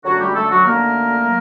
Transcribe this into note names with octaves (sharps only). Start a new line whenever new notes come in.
F#2 D3 F#3 A3 F#4
G3 G4
A3 A4
F#3 F#4
F#2 D3 A3 A#3 A#4
F#3 A3